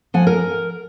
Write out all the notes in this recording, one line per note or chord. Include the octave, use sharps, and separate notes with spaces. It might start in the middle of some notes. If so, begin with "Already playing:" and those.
F3 F#5 G#5
A#4